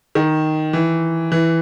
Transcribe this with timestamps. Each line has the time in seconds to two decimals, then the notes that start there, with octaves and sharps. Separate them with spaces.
0.15 D#3
0.73 E3
1.32 E3